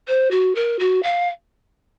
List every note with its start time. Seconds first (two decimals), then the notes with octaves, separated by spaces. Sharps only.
0.08 C5
0.31 F#4
0.55 A#4
0.79 F#4
1.03 F5